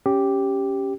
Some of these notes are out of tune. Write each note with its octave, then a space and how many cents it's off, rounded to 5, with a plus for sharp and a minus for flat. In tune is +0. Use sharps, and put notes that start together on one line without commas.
C#4 +0 G4 +0